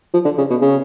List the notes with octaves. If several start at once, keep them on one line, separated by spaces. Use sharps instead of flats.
F3
D3
C#3
B2
C#3